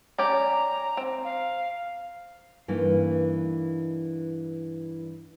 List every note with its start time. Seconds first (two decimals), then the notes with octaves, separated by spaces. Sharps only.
0.18 C#4 G4 D5 A#5
0.97 C4
1.24 F5
2.68 G2 E3 A#3 D#4